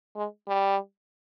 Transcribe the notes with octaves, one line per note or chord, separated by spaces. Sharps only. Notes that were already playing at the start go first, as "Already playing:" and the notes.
G#3
G3